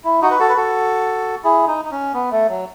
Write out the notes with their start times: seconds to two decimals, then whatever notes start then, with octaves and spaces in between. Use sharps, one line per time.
0.04 E4
0.22 D#4 F#4
0.31 B4
0.39 F#4 A4
0.49 B4
0.56 F#4 A4
1.44 E4 G#4
1.67 D#4
1.85 D#4
1.91 C#4
2.14 B3
2.31 A3
2.49 F#3